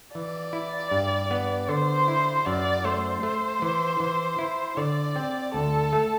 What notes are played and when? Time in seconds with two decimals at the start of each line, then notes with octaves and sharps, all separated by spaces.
0.15 E3 D5
0.53 E4
0.91 G2
1.31 B3
1.68 D3 C5
2.08 E4
2.46 F#2 D5
2.84 A3 C5
3.23 A3
3.62 E3
4.00 E3
4.39 E4
4.77 D3 D5
5.16 C4
5.54 D2 A4
5.93 A3